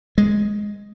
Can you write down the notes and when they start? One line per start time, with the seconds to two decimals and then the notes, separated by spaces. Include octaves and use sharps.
0.18 G#3